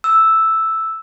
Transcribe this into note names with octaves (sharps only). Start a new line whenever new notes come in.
E6